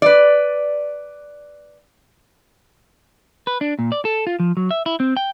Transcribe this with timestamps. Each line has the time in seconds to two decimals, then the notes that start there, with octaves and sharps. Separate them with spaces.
0.02 B4 D5
3.47 B4
3.61 D4
3.79 A#2
3.92 D5
4.05 A4
4.27 F4
4.40 F3
4.57 F#3
4.71 E5
4.86 E4
5.00 C4
5.17 G5